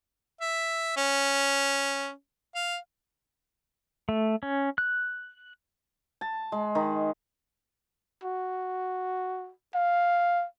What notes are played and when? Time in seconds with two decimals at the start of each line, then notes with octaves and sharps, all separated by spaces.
0.41 E5
0.97 C#4
2.55 F5
4.09 A3
4.43 C#4
4.78 F#6
6.21 A5
6.52 G#3
6.75 D#3
8.23 F#4
9.75 F5